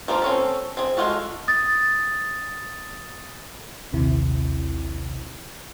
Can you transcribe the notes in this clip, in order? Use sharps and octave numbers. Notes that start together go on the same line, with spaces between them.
F3 A#3 F4
C4 C#4 A4
C4 G#4
G#3 B3 F4 F#4 A4
D#6 A6
A#1 D#2 C3 E4